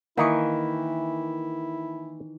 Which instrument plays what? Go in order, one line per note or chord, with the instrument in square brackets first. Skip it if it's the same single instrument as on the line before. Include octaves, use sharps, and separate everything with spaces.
[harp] D#3 E3 C#6 [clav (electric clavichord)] A#3 D#5 [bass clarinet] E4